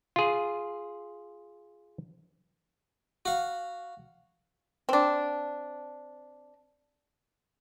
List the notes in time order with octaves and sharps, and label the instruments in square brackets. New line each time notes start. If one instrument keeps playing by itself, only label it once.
[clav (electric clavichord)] F4 G#4
[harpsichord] F#4 F5
[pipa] C4 D4